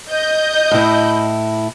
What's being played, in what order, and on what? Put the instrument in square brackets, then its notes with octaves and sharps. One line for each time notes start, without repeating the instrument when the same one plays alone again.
[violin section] D#5 G6
[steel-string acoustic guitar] A2 E4